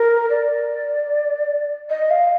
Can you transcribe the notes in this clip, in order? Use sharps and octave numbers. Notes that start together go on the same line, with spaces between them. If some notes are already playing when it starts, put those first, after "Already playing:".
Already playing: A#4
D5
D#5
F5